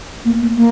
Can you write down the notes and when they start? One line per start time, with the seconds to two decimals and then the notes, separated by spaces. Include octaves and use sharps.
0.25 A#3
0.41 A#3
0.56 A#3